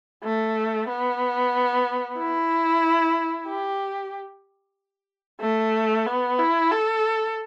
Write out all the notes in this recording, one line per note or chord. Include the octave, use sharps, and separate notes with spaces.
A3
B3
E4
G4
A3
B3
E4
A4